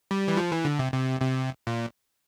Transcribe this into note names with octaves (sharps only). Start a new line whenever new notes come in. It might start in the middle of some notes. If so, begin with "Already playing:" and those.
G3
E3
F3
E3
D3
C3
C3
C3
A#2